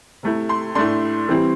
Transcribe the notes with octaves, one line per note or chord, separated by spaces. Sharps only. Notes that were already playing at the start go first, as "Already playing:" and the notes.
C3 A3 E4
C6
A2 A3 D4 C6
E3 G3 C4 E4